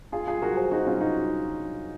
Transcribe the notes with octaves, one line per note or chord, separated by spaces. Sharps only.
F4 G#4
F4 G#4
F#4 A#4
G#4 C5
D#4 F#4
C#4 F4
D#4 F#4